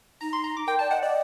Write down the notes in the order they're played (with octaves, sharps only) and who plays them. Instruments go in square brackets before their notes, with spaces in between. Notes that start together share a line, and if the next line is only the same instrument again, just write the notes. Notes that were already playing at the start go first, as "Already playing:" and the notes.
[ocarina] D#4 [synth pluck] A#5
[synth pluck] C6
A#5
D6
[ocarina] A#4 [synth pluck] G5
[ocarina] D5 [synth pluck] A5
[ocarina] D#5 [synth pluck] F#5
[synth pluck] D5 [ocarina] D#5